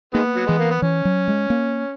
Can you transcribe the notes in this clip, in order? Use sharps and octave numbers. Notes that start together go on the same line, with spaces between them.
D#3 G#3 A#3 B3
F#3
E3 G#3
A#3
B3
E3 C#4
F#3
G#3
A#3